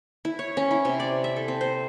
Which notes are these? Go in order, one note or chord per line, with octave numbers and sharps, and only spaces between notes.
E4
C#5
C#4
E4
C3
D5
E5
A4
C4
C5